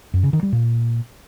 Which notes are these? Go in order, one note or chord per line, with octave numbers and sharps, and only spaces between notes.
F#2
C#3
D#3
G3
A#2